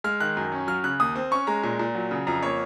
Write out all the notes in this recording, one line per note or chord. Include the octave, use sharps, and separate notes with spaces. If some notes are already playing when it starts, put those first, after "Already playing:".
G#3 F6
D#3 F#6
F#2
C#4
F#3 F6
C#3 F#6
D#2 D#6
C4
C#4 C#6
G#3 A#5
A#2
A#2
F#3
C#3
F2 A#5
A#3 C#5